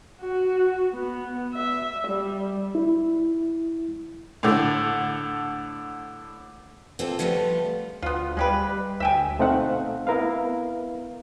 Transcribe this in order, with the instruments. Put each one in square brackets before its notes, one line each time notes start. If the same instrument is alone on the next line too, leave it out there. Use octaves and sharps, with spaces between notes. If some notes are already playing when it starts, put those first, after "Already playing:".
[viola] F#4
B3
E5
G3
[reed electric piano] E4
[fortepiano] A2 D3
[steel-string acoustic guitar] A#3 C4 F4 A4
A2 F3 G3 A3 B3 F4
[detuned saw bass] D2 [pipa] B3 F4
[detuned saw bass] G3 [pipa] G#3 G4 B4
[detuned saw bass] D2 [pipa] E5 G5 G#5
[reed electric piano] B2 A3 C4 D#4 F5 F#5
B3 E4 A#4 B4 F5